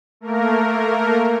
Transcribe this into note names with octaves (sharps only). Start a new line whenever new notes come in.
A3 A#3 A#4